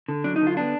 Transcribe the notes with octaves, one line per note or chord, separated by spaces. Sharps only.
D3
F#3 D4
D#4
D3
F4
B3 D4